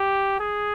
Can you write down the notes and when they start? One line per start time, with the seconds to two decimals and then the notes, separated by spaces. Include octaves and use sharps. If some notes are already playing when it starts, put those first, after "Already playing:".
Already playing: G4
0.40 G#4